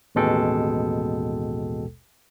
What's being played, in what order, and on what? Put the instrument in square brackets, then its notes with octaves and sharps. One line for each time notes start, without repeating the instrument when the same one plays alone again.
[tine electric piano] A1 D#2 B2 G#3 A4 G5